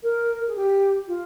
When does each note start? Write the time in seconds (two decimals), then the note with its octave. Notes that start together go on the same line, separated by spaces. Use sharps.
0.03 A#4
0.48 G#4
0.56 G4
1.07 F4